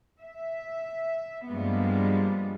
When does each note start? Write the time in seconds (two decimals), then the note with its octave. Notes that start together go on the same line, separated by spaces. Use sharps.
0.19 E5
1.48 G2 F3 G3 G#3 A#3 B3